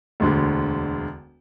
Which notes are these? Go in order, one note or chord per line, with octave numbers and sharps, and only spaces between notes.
E1 D2 D3